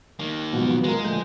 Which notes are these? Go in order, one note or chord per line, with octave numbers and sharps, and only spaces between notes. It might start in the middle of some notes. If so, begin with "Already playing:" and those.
D#3 A#3
G#2 B2 F3 F#3 B3
G#3 F4 A#4
D2 G#2 F3 A3 G5